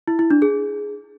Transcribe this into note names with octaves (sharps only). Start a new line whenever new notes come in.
E4
E4
D4
G#4